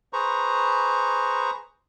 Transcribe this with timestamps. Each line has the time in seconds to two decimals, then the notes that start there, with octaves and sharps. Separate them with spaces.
0.13 G#4 B4 C5 A#5 C#6